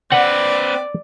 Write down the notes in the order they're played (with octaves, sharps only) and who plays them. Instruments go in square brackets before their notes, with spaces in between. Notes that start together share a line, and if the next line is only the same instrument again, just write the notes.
[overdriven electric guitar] C4 B4 [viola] D5 [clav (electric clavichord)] F#5